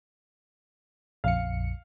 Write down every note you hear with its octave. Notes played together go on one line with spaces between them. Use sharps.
A#1 F2 F5 C#7